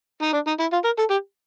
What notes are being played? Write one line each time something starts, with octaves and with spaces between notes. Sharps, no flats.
D#4
D4
D#4
E4
F4
A#4
A4
G4